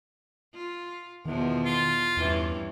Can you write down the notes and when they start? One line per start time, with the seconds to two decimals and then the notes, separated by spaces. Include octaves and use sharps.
0.54 F4
1.26 E2 B2 D#3 F3
1.66 F4
2.17 E2 G2 E3 C#4